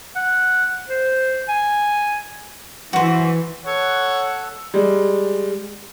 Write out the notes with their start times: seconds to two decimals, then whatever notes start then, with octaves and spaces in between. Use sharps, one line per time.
0.16 F#5
0.88 C5
1.48 G#5
2.93 E3 F#4 C5
3.66 A4 C#5 F#5
4.74 G3 G#3